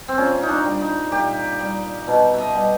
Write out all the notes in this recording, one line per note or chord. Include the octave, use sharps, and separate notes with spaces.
C4
A#2 C#4
D#4
D4
G3
D#4
A#2 G4
G3
B2
D#5 E5
G3